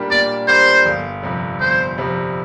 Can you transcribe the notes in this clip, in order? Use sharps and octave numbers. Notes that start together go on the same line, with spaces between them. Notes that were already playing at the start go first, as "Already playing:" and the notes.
Already playing: A#2 G3 D4 G4 A#4
A#2 D5
G3 D4 G4 A#4 C5
G1
F2 C3 G3
G1 C5
F2 C3 G3